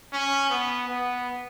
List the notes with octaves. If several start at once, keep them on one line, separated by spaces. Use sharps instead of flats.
C#4
B3
B3